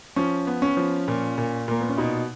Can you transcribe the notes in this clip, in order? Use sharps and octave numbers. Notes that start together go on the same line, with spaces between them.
F3 C#4
B3
C#4
F3
A#2
A#2
A#2 A#3
B3
C#4
B2 D#4